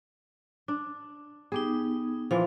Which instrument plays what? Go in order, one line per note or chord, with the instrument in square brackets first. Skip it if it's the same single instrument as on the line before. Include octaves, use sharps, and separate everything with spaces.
[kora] D4
[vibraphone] B3 D#4 [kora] G4 G#4
[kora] A#2 E3 F3 [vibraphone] F5